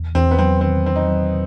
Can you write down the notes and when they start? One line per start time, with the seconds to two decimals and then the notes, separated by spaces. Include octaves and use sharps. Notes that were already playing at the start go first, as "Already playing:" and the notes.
Already playing: E2
0.15 E2 C4
0.31 B3
0.39 F#3 C4
0.61 D#3 C4
0.84 E2 C4
0.96 D#4
1.07 F#3